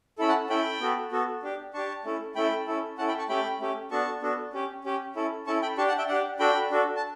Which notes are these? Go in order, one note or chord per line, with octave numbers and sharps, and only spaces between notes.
C#4 E4 A4 B5
F#5 A5
C#4 E4 A4 G5 B5
B3 F#4 A4
B3 F#4 A4
D4 G4
D4 G4 A5 C#6
A3 C#4 E4 A4
A3 C#4 E4 A4 G5 B5
C#4 E4 A4
C#4 E4 A4 F#5 A5
G5 B5
A5 C#6
A3 C#4 G4 G5 B5
A3 C#4 G4
B3 D4 F#4 A4 A5 C#6
B3 D4 F#4 A4
C#4 G4
C#4 G4
C#4 E4 A4
C#4 E4 A4 A5 C#6
G5 B5
D4 G4 A5 C#6
F#5 A5
E5 G5
D4 G4 D5 F#5
D4 F#4 A4 G5 B5
D4 F#4 A4
A5